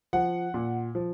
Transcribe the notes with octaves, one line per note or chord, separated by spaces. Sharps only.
F3 F#5
A#2
F3